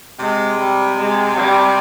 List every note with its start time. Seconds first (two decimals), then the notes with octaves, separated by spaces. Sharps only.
0.19 C3 G#3
0.58 G3
0.97 G#3
1.35 G3